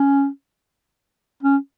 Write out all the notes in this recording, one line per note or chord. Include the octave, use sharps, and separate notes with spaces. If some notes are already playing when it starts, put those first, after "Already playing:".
Already playing: C#4
C#4